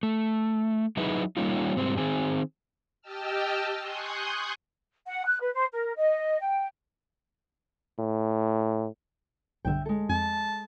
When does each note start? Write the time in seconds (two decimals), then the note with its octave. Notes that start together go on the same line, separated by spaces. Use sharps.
0.03 A3
0.97 F#3 D#4 E4 G#4 B4
1.37 G3 A#3 C#4 D#4 F4
1.77 G#2 G3 C4
1.97 D#3 C4 G#4
3.02 G4 D#5 G5 A5 E6 F6
3.79 G#5 C6 C#6 D#6 F#6 G6
5.07 F#5
5.26 F#6
5.41 B4
5.53 C5
5.72 A#4
5.96 D#5
6.41 G5
7.99 A2
9.65 B1 G2 D3 E5 G5
9.86 G#3 A4
10.09 F2 A5